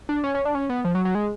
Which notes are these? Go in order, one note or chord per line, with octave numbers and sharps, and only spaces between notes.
D4
C#4
C#4
D4
C#4
B3
F3
F#3
F#3
G#3